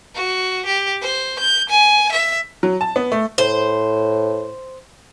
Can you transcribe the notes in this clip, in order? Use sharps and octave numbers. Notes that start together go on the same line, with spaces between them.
F#4
G4
C5
G6
G#5
E5
F#3
A5
B3
A3
A2 C5